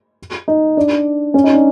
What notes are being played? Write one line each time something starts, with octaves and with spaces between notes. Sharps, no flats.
D#4
D4
C#4
D#4
D4